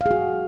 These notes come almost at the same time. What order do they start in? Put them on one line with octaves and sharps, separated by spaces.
F5 G#4 F#4